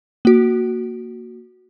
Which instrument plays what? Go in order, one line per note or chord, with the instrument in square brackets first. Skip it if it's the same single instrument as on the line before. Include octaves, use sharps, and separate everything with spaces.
[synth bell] A#3 F#4